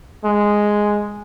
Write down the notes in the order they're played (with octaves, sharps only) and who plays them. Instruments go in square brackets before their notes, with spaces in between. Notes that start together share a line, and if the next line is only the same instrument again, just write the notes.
[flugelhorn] G#3